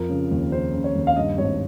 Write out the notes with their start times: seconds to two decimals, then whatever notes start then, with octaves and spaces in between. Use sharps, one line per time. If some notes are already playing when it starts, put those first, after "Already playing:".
Already playing: F2 F3 A#4
0.09 C#3
0.31 D#2
0.52 C#3 C5
0.74 C#3
0.84 C#5
0.95 D#2
1.07 F5
1.16 G2 D#5
1.38 G#1 C#5